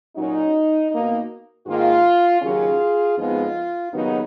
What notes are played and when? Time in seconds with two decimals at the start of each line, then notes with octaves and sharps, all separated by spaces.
0.16 A#2 F#3 C#4 D#4
0.92 B2 A#3 D#4
1.66 G#2 D#3 A#3 F4
2.42 D#2 C#3 F#3 C#4 F4 G#4
3.17 F2 F3 G#3 B3 D#4 F4
3.93 D#2 C#3 F#3 B3 D#4